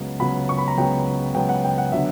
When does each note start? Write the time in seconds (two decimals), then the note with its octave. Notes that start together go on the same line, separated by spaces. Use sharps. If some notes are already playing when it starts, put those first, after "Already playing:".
Already playing: C#2 C#3 F#3 B3
0.20 C#2 C#3 F#3 B3 B5
0.49 C#6
0.58 B5
0.68 A#5
0.77 C#2 C#3 F#3 B3 G5
1.35 C#2 C#3 F#3 B3 G5
1.49 F#5
1.64 G5
1.78 F#5
1.92 D3 F#3 B3 E5